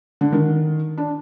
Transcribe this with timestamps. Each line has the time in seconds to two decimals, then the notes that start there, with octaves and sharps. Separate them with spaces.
0.21 D3
0.32 D#3
0.98 D4